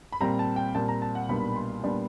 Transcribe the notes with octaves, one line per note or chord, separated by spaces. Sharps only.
B5
A#2 G3 C4 A#5
A5
G5
A#2 G3 C4 A5
A#5
A5
F#5
B1 A#2 G3 B3 D4 B5
C6
A#2 G3 B3 D4